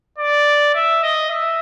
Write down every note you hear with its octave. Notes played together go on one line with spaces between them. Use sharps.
D5
E5
D#5
E5